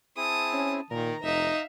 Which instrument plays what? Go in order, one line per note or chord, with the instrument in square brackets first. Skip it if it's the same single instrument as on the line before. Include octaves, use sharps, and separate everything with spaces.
[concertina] C4 E4 G#4 [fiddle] A5 D#6
[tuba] C#4
[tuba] A#2 [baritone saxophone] D#3 [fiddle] A#4 [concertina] A#5
[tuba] F1 [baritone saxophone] D#4 [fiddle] E5 F5